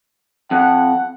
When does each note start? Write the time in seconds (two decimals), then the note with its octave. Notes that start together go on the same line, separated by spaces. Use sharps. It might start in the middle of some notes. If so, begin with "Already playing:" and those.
0.51 F2 F#5